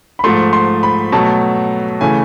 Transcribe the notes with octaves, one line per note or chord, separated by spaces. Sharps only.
B5
G#2 F3 A3 C6
C6
B5
B2 F#3 A3 A5
C#3 E3 A3 G#5